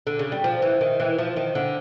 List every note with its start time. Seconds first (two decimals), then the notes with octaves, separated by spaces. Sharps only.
0.07 D3
0.19 C#3
0.32 G3
0.44 F3
0.62 E3
0.81 D#3
1.00 E3
1.19 F3
1.36 D#3
1.55 D3